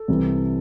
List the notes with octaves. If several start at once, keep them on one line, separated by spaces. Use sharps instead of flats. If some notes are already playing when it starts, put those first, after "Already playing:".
Already playing: A4
C2 C3 E3